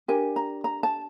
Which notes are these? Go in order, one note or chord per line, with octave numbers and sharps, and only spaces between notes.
D4 G4 A#4 G#5
A#5
A#5
A5